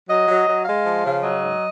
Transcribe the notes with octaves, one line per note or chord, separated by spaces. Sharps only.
F#3 D#5
F#3
F#3
G#3 F5
F3
C#3
F#3 D#5
G#2